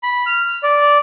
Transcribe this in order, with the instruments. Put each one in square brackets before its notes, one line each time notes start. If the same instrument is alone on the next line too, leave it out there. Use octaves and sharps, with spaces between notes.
[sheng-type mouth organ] B5
F6
D5